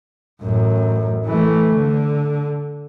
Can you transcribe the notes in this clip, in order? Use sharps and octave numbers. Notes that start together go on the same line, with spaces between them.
A1 F#2
E3 A3
D3